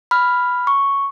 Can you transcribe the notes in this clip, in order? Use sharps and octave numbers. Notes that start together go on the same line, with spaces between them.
B5 F6
C#6